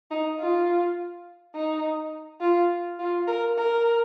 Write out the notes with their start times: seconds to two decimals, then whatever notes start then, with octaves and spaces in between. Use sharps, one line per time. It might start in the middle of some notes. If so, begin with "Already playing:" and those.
0.11 D#4
0.40 F4
1.55 D#4
2.41 F4
2.99 F4
3.27 A#4
3.57 A#4